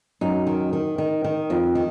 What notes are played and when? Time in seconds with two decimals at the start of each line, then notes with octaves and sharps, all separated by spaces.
0.21 F#2 D#4
0.47 D#3
0.73 D#3
0.98 D#3
1.24 D#3
1.50 F2
1.75 D#3